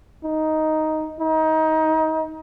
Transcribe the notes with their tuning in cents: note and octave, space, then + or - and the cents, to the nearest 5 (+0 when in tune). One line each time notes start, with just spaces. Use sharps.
D#4 +5
D#4 +25